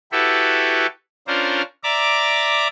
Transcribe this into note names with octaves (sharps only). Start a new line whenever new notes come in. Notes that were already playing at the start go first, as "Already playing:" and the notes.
E4 F#4 G4 A4 B4
C#4 D4 F4 A#4 C5
D5 E5 A#5 D6